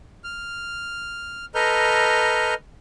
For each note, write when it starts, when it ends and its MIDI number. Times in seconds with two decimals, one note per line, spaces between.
0.24 1.45 89
1.55 2.54 69
1.55 2.54 71
1.55 2.54 75
1.55 2.54 82
1.55 2.54 89
1.55 2.54 91